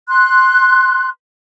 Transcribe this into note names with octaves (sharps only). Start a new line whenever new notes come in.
C6 F#6